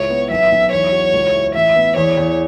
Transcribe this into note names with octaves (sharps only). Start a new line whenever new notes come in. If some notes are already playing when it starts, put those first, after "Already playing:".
Already playing: C#2 E4 C#5
B3
B1 E5
B1
E2 C#5
F#4
C#2
E4
A1 E5
B3
E2 C#5
E2